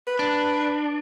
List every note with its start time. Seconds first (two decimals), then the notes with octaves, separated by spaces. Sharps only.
0.07 B4
0.19 D4